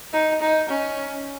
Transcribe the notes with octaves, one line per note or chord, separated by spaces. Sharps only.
D#4
D#4
C#4